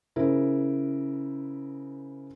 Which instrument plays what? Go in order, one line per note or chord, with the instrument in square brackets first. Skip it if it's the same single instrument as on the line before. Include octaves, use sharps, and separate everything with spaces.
[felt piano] C#3 E4 A#4 C5